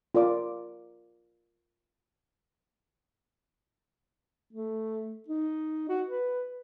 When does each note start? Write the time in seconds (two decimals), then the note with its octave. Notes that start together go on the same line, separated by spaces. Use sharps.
0.15 F4 A#4 D5 D6
4.53 A3
5.29 D#4
5.89 F#4
6.08 B4